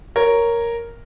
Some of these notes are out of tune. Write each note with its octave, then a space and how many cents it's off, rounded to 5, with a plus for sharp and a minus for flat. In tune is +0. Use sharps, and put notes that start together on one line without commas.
A#4 +0 C#5 +0